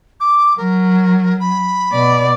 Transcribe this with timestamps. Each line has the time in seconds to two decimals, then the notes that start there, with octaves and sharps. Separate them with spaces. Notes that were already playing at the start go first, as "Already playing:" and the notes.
0.20 D6
0.58 F#3 A#4
1.40 B5
1.92 B2 D5